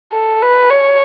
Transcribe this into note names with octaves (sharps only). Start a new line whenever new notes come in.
A4
B4
C#5